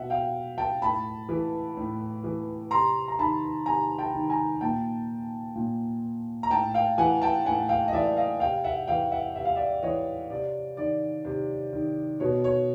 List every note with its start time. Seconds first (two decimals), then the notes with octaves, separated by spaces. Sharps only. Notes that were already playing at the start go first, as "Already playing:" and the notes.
Already playing: B2 E5 F#5
0.10 F5 G5
0.58 G5 A5
0.82 A2 A5 B5
1.29 E3
1.77 A2
2.24 E3
2.71 C3 A#5 C6
3.08 A#5
3.19 D#3 A5 B5
3.66 C3 G#5 A#5
3.99 G5 A5
4.14 D#3
4.30 G#5 A#5
4.61 A#2 G5 A5
5.56 A#2
6.43 A#5
6.50 A2 G5 A5
6.74 F5 G5
6.98 E3 F#5 G#5
7.22 G5 A5
7.45 A2 F#5 G#5
7.69 F5 G5
7.88 D#5
7.93 E3 D5 E5
8.17 D#5 F5
8.40 C3 F5 G5
8.64 E5 F#5
8.87 E3 F5 G5
9.11 E5 F#5
9.35 C3 E5
9.45 F5
9.55 D5 E5
9.83 E3 C#5 D#5
10.30 C3 D5
10.77 D#3 D5
11.25 C3
11.73 D#3
12.20 B2 C#5
12.44 C#5